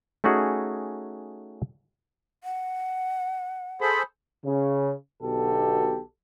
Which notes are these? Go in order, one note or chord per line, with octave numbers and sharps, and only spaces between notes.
A3 C#4 D#4 F#4 G#4
F#5
G#4 A4 C5 B5
C#3
B1 B2 D3 G4 A4